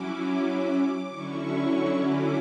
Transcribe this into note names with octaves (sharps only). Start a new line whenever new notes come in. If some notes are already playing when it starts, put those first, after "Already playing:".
Already playing: F#3 C#4 E4 D6
D3 F#3 C#4 E4 C#6
D6